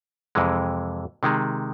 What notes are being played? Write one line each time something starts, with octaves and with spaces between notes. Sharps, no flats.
F2 C3 E3 G#3
C3 D#3 G#3